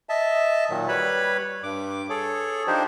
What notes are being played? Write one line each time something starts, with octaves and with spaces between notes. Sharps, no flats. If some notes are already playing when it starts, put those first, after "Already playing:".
D#5 E5 A5
A#2 D#3 F#3
G3 B4 C#5 B5
G2 D6
G#4 A4 C#5
F3 D4 D#4 G4 C5